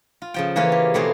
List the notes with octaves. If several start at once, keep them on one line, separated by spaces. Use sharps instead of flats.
F4
C#3 F3 G5
E3 A#3 C#4 F4
G4
B2 A3 A#3 C4 G#4